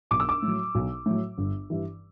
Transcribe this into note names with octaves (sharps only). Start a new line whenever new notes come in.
B1 D6
E6
D6
A2 F#3
B1
A2 F#3
G1
G2 E3